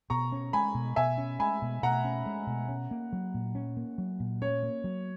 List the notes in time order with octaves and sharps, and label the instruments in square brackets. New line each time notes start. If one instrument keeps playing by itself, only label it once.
[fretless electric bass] B2 [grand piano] A#5 C#6
[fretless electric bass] C#4
[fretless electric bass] G#3 [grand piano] G#5 B5
[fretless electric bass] B2
[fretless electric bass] B2 [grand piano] E5 G#5
[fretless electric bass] C#4
[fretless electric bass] G#3 [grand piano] G#5 B5
[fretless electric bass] B2
[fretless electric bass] B2 [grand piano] F#5 A#5
[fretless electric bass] C#4
G#3
B2
C#4
A#3
F#3
A#2
C#4
A#3
F#3
A#2
[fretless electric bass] C#4 [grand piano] C#5
[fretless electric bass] A#3
F#3